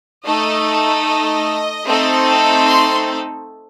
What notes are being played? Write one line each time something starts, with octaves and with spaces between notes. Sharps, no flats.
A3 D#4 A4 D#5
D#5
A3 C4 D#4 A4
C6